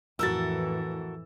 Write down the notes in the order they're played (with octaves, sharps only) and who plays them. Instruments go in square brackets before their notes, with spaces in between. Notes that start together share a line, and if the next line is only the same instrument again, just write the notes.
[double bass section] F2 A2 E3 [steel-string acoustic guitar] F#4 A4 A#4 [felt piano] E6 A6